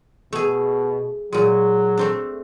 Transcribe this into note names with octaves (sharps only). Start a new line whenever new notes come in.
B2 A3 G#4
A#2 F#3 G#3
A3 C4 D4